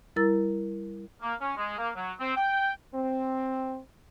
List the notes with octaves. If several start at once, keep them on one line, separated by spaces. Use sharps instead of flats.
G3 E4 A#4 A#5 E6 A6
A#3
C#4
G#3
A#3
F#3
C4
G5
C4